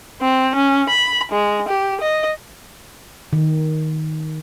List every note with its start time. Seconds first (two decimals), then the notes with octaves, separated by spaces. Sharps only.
0.21 C4
0.55 C#4
0.89 B5
1.32 G#3
1.69 G4
2.01 D#5
3.33 D#3